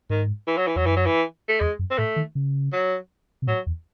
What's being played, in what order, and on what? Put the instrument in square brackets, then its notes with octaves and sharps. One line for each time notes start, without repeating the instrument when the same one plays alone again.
[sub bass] G#2 [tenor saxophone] D#3
[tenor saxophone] E3
F#3
E3
[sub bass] E2 [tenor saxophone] F#3
[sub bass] F#2 [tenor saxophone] E3
[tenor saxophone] F#3
E3
A3
[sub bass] E2 [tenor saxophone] G#3
[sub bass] F#2
[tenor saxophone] C4
[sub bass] A2 [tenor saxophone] A3
[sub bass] D#3
C#3
[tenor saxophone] F#3
[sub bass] C3
[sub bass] A2 [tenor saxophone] F#3
[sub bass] E2